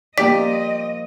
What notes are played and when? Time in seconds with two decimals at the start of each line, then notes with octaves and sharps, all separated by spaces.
0.18 F3 A#3 G4 D5 D#5 B6